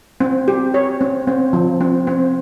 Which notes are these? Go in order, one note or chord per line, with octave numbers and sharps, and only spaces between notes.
C4
G4
C#5
C4
C4
F3
C4
C4